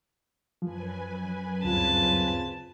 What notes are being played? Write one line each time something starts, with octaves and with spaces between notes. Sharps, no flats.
F#2 F3 B4 G#5
D2 G2 C#3 C4 F4 A5